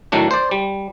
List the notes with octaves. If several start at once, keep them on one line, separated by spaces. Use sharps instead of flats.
A2 D#3 F#3 A3 D4
C5 D5
G3